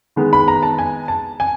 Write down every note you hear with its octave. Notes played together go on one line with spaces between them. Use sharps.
D#3 G#3 B3 D#4
B5
A#5
A5
G#5
A5
G#5